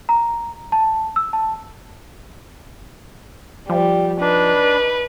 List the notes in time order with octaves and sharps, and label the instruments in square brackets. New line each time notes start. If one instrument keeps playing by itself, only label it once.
[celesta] A#5
A5
E6
A5
[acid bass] F3 [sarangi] G3
[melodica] D4 [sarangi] D#4 [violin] B4